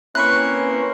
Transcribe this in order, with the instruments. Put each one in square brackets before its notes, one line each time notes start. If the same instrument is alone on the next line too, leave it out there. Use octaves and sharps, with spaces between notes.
[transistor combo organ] A#3 C4 [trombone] C#4 [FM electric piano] E4 B4 C#6 [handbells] F#6